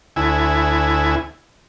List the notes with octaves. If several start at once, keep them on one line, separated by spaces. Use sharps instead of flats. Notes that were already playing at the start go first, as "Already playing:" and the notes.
D2 E4 G#5